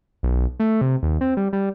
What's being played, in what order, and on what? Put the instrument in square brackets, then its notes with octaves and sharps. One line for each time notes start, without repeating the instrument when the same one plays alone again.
[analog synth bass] B1
A3
C3
D#2
C4
G3
G3